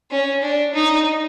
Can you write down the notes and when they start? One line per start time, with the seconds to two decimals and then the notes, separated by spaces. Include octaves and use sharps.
0.11 C#4
0.42 D4
0.74 D#4